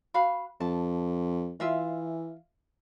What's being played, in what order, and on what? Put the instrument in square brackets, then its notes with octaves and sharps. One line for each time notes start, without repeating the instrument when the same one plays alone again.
[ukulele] F#4 F5 B5
[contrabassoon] F2 [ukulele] A5
[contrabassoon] E3 [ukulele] F4 E5 F5